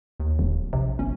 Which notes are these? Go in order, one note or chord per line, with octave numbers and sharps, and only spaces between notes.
D#2
D1
A#1 C3
G1 C#4